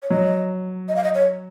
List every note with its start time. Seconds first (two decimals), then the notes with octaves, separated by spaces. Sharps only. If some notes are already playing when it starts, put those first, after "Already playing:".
0.03 C#5
0.10 F#3 D#5
0.88 D#5
0.96 F5
1.04 D#5
1.15 C#5